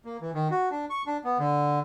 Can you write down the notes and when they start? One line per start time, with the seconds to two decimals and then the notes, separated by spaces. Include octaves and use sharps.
0.05 A#3
0.21 E3
0.34 D#3
0.50 F#4
0.71 D4
0.90 C#6
1.07 D4
1.24 B3
1.39 D3